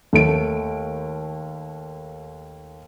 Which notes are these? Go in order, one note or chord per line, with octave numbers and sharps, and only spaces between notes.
D#2 A3 D7